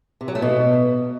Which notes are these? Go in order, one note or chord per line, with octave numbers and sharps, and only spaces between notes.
C3
F#3
A3
B2